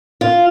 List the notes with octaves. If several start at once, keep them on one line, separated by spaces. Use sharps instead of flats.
F4